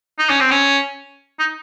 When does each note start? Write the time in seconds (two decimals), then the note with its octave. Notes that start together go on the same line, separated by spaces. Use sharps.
0.19 D#4
0.30 C#4
0.40 C4
0.51 C#4
1.39 D#4